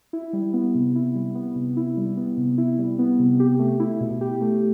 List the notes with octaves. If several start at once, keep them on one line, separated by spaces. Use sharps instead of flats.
E4
G3
B3
C3
E4
G3
B3
C3
E4
G3
B3
C3
E4
G3
B3
C3
G4
A3
E4
B2
G4
A3